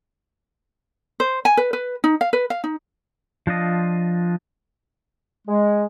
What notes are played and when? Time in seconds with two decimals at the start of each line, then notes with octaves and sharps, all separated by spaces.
1.20 C5
1.45 G#5
1.57 B4
1.73 B4
2.04 D#4
2.21 F5
2.33 B4
2.50 F5
2.64 D#4
3.47 F3 D4 F4 D#5
5.48 G#3